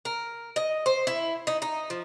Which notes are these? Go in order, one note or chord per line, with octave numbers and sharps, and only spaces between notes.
A#4
D#5
C5
E4
D#4
D#4
F3